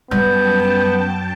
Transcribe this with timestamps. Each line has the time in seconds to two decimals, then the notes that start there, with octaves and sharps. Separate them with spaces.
0.11 F#2 G3 B3 G5 A5 G6